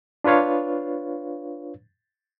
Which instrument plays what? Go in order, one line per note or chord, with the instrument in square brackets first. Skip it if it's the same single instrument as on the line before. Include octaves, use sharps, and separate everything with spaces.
[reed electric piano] D4 F4 B4 C#5 F5